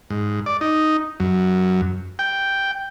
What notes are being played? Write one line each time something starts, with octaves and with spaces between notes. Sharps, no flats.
G#2
D5
D#4
F#2
G5